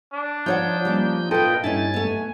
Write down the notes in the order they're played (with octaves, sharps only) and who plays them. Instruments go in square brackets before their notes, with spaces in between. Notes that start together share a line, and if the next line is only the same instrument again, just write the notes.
[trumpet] D4
[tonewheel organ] F3 D#4 G6 [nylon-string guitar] F4 C#5 F#5
[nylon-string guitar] G3 A#3 C#4
[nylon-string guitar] A#2 A4 [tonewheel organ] F4 B4 D#5 [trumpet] G5
[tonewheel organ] G2 A6 [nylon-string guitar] C#4 D#4 E4 [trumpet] G#5
[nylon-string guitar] A3 B3